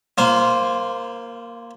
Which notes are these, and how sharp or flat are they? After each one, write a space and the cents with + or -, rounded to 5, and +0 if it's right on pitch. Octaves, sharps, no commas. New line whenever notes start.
A#3 +0 F4 -35 C5 +0